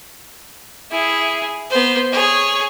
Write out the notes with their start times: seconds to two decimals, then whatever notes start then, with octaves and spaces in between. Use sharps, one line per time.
0.91 E4 G#4
1.70 B3 C5
2.12 G#4 C#5